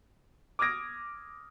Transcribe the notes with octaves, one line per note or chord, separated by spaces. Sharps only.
D6 D#6 F6 G#6 A#6 D7